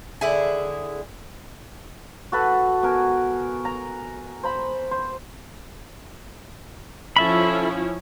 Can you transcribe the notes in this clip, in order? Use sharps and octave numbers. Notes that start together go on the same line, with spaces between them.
D3 E4 G#4
F#4 A4 B4
B2 A#4 G#5
A#5
C5 A#5 B5
C5
F3 C#4 E4 A4 E5 B5